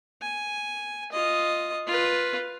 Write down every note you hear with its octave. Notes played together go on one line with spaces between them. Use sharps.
G#5
F4 D#5
F4 B4